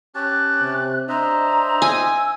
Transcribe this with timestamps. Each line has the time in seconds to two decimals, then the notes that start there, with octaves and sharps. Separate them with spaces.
0.15 C#4 G4 A5 F#6
0.61 C3
1.09 D4 C5 D#5 E5 A#5
1.82 G#5 E6